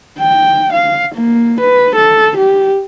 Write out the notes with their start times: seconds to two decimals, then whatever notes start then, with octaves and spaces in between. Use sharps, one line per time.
0.19 G5
0.73 F5
1.15 A#3
1.60 B4
1.95 A4
2.37 G4